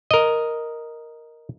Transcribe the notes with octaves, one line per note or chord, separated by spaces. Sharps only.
A#4 D#5